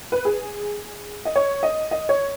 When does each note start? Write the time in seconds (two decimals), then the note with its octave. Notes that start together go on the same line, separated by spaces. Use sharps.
0.12 B4
0.25 G#4
1.25 D#5
1.36 C#5
1.63 D#5
1.91 D#5
2.09 C#5